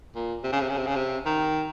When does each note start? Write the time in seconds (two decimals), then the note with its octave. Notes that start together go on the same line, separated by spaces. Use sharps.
0.16 A#2
0.44 C3
0.52 C#3
0.61 C3
0.70 C#3
0.77 C3
0.87 C#3
0.96 C3
1.26 D#3